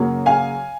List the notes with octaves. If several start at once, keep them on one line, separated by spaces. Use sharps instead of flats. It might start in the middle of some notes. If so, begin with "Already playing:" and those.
Already playing: F#2 C#3 F#3 A#3
F5 G#5